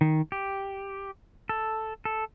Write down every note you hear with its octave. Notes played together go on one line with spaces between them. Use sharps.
D#3
G4
A4
A4